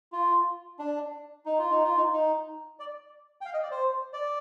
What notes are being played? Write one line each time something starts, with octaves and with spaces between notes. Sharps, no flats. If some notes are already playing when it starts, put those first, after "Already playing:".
F4
D4
D#4
F4
D#4
F4
D#4
D#4
D5
G5
F5
D#5
D5
C5
D5